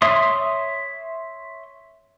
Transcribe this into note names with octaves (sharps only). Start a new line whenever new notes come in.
C#5 E5 C6 D#6